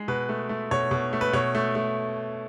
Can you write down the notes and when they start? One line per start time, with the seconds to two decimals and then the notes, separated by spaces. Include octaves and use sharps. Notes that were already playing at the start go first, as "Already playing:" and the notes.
Already playing: G#3
0.08 B2 B4
0.29 A3
0.49 A3
0.71 B2 C#5
0.91 B2
1.13 A3
1.21 B4
1.33 B2 C#5
1.55 A3
1.75 A3